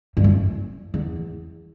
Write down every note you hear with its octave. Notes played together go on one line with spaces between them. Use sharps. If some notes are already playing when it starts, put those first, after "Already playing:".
G2
F#2
E2